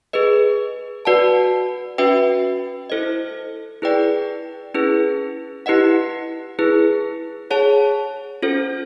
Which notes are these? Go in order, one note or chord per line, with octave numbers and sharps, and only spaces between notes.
G#4 B4 D#5
F#4 B4 D5 F#5 A5
C#4 F#4 B4 E5 G5
E4 A4 C5 D#5
E4 G#4 B4 D5 G5
C#4 E4 G#4 B4
E4 G4 B4 D#5 F#5
E4 G#4 B4
G#4 C#5 F#5 A5
C#4 F4 A4 C5